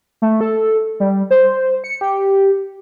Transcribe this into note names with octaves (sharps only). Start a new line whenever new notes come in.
A3
A4
G3
C5
C#7
G4